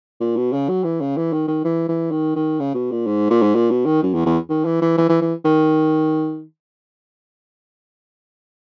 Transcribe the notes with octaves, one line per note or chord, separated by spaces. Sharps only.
A#2
B2
C#3
F#3
E3
C#3
E3
D#3
D#3
E3
E3
D#3
D#3
C#3
B2
A#2
G#2
A#2
G#2
A#2
B2
D#3
F#2
E2
E2
D#3
E3
E3
E3
E3
E3
D#3